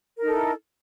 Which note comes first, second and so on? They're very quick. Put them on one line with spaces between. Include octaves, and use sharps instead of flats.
A#4 D#4 A4 E4